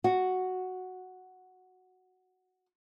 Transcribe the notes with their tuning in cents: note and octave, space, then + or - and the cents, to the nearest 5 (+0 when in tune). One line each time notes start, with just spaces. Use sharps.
F#4 +0 F#5 +0